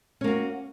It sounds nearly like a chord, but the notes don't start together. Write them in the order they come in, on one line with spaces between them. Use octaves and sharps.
C#4 A#3 F#4